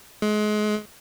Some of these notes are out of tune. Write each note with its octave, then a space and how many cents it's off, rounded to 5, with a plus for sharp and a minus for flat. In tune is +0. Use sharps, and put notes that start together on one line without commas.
G#3 +30